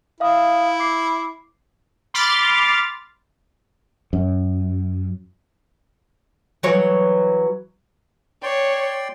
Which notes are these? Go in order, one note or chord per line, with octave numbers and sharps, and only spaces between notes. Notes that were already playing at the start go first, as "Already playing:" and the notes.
E4 E5 F5 D#6
D6 C7
B5 C6 D6 F6 A6
F#2
E3 F#3 C#5
C#5 D5 G5 C6